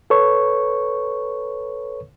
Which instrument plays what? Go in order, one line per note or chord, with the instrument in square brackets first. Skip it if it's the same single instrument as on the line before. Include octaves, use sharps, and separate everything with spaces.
[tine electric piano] A4 B4 C#5 C#6